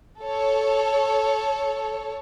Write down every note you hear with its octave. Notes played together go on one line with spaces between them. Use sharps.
A4 C#5